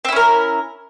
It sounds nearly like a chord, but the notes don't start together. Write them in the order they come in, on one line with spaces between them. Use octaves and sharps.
C4 E4 C#4 A#4